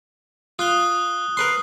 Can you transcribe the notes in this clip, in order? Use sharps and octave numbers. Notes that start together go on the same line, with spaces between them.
F4 D#6 F#6 G7
A#4 B4 C6